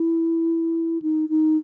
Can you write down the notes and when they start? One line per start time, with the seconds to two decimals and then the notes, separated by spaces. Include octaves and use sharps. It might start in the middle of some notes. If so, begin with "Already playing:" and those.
Already playing: E4
1.02 D#4
1.29 D#4